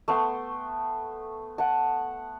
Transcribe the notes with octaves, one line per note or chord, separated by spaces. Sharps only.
A3 B3 G5 C6
F#5 A5